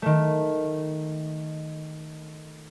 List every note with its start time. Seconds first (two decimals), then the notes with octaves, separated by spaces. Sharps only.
0.02 D#3 A3